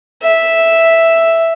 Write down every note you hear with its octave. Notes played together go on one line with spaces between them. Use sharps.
E5